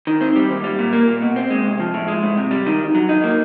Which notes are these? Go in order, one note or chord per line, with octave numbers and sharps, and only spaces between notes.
D#3
C4
G3
D#2
G3
A#2
A#3
A#2
B2
C4
G#3
C2
F3
A2
G#3
A2
C3
G3
D#3
D2
F#3
D#4
A#3